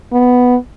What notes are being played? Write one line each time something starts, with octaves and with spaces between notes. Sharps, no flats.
B3